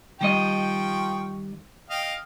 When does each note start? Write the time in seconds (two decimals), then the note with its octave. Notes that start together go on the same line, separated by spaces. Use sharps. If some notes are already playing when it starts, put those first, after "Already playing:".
0.21 D#3 F3 G3 D#5 G5 C#6
1.90 D#5 F5 G5